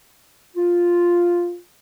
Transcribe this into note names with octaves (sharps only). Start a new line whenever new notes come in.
F4